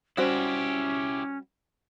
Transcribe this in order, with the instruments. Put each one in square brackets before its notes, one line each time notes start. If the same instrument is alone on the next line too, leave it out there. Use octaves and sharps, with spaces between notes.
[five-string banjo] G3 F#4 C5 [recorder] C#4 [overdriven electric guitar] E4 G4